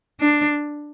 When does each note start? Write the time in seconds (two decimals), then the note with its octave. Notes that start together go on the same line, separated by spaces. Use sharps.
0.21 D4